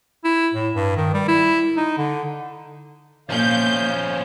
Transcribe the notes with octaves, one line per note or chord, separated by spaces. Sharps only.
E4
A2
G2
D#3
G3
E4
D#4
D3
A#2 F3 C#4 F5 G6